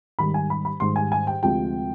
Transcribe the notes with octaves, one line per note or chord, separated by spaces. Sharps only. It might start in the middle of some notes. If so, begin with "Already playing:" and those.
G#2 D#3 G3 B5
G#5
B5
B5
G#2 D#3 G3 C6
G#5
G#5
G5
D2 C3 F3 G#3 G5